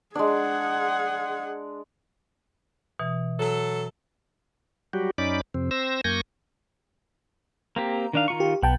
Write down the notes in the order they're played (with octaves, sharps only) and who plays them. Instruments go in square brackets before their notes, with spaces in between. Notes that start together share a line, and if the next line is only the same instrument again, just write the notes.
[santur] G#3 D4 [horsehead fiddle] G#4 F#5
[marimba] B2 E3
[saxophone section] F#3 A4
[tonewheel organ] F#3 G3 F#4 G4
F#2 C#4 D#4 D5 B5 D6
F2 C3 C4
C4 C5 E6 A#6
F#2 A#3 G#5 C#6 G6 A#6
[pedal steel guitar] A#3 C4 G4 [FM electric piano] A#5
[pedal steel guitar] D#3 D4 F5
D#3 F4 C#6
[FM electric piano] G4
[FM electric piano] B1 G5 A5 [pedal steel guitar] B3